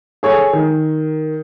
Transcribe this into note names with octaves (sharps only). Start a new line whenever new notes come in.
G#4 A4 C#5
D#3